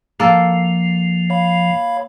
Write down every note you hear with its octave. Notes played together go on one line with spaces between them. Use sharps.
F3 A#3 A4
C#5 F5 B5